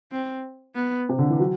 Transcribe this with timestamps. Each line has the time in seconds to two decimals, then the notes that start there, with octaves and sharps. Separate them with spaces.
0.12 C4
0.75 B3
1.09 C3
1.19 D3
1.30 E3
1.40 F#3